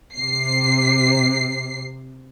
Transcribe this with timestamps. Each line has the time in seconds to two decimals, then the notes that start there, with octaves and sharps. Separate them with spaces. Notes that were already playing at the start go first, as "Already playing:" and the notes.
0.15 C3 C7